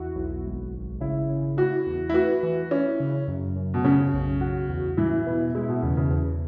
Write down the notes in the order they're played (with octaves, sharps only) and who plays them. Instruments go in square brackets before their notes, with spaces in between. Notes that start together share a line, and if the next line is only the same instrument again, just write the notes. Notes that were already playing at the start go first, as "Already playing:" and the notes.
Already playing: [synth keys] E2 E4 F#4
B1
G#1
G#1
[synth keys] C#3 [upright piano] E4
[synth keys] C#3
[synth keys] E4 [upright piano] F#4
[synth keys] E2
[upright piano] E4
[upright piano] F#4 [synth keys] B4
[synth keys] E3
[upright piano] C#4 [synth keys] E4
[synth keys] C#3
F#2
F#2
[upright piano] B2
[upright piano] C#3 [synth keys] C#4
[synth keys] B1
F#4
E2
[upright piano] E3 [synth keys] E4
[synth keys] B2
[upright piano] G#3 [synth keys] E4
[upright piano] B2
[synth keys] E2 [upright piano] C#3
[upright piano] C#3
[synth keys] E2